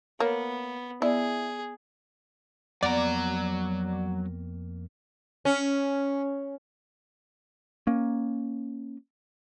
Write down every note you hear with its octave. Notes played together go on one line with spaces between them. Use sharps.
A#3 B3 C#5
B3 E4 G#4 D5
F2 F#3 A#3 B3 D5 F#5 A#5
C#4
A#3 C#4